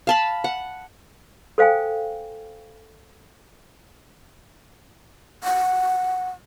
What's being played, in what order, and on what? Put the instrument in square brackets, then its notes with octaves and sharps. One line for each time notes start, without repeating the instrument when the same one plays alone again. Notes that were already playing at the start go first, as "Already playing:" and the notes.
[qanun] F5 A5 B5
F#5
[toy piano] A4 C5 F5 G5 G#5
[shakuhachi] F#5